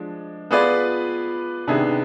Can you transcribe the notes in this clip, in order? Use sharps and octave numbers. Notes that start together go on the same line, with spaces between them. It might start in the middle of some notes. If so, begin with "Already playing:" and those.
Already playing: F3 G#3 D4
B3 F4 G#4 B4 D5
C3 D#3 B3 D4 G#4